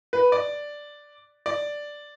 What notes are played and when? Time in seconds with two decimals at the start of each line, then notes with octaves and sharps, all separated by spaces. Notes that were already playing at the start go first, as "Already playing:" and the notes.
0.13 B4
0.32 D5
1.46 D5